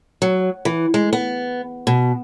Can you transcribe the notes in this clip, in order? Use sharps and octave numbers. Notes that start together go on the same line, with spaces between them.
F#3
E3
G#3
B3
B2